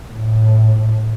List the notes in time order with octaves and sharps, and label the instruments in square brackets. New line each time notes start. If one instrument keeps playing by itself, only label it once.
[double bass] A2